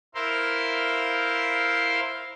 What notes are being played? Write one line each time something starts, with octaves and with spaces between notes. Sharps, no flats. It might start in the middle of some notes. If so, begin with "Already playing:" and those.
E4 A#4 C5 E5 F5 C6